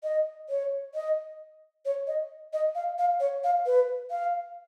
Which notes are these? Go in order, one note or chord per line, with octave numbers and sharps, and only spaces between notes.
D#5
C#5
D#5
C#5
D#5
D#5
F5
F5
C#5
F5
B4
F5